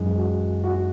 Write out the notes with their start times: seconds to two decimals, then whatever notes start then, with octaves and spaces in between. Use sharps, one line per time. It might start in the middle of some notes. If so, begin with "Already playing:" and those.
Already playing: F#2 E3 G#3
0.18 F#4
0.64 F#4